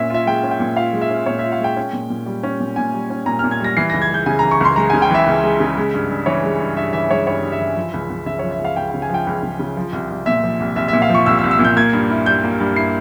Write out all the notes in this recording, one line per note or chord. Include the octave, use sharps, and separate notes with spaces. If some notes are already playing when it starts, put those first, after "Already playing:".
Already playing: A#2 C#4 E5
F4 E5
G#3 G5
C#4
G5
A#2
F4 F5
G#3
E5
C#4
A#2 C#5
F4 E5
F5
G#3 G5
C#4
A#2
A#2
G3
C#4
A#2
A#2 G#5
G3
C#4
A#2 A#5
A#2 F6
G#6
G3 A#6
E3 C7
C#2 A#6
G#6
G#3 G6
C#3 G#5
E3 A#5
C#6
C#2 C6
G#3 A#5
C#3 G#5
G5
E3 E5
C#2
G#3
C#3
G#3
G2
G2
E3 C#5
G#3
G2
G2 E5
E3 E5
G#3 C#5
G2 C#5
G2
E5
E3
F3
C#2
C#2
C#3 E5
F3 C#5
E5
C#2
F5
C#2 G5
C#3 G5
G#5
F3 G5
C#2
C#2
C#3
F3
C2
C2
A#2 E5
F3
C2
C2 E5
E5
A#2
F5
F3 C#6
C2 E6
E6
C2
E6
A#2
G6
A#3 G#6
G2
E4
G3 G6
A#3
G2
E4 C7